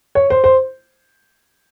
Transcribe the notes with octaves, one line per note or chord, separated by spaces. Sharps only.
C#5
C5
C5